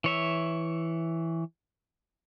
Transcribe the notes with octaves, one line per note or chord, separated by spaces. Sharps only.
E3 C#5 E5